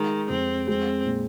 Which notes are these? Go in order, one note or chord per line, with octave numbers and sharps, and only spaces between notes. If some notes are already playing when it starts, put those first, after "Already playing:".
Already playing: D#3 G#3
F2 C4
G#3 C4
A#2